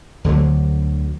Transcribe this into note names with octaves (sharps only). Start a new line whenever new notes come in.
D2 D3 F3 F#3